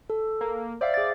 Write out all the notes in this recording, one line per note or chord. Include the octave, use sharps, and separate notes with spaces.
A4
A#3
C5 D5 E5 F5
G#4 A6